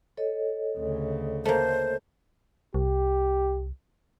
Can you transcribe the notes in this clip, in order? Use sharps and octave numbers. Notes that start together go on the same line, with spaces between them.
A4 C#5 D#5
D2 C#3
A3 A#3 C5
C2 G4